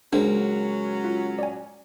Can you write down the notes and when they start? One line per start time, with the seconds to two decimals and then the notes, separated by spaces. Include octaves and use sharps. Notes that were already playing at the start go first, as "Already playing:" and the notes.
0.13 C#2 F#3 A#3 C#4 D4 C5
1.04 F4
1.39 D5 G#5